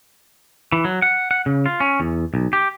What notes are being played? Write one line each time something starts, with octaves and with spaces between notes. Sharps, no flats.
E3
F#3
F#5
F#5
C#3
F4
C#4
E2
B1
G4